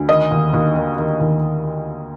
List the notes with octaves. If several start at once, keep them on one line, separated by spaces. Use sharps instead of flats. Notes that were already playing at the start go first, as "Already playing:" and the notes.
Already playing: D2
D#3 D#5
D#2
D#2
D#3
D#3
D#2